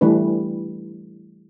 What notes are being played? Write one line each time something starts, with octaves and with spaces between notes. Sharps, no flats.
E3 G3 A3 D4 B4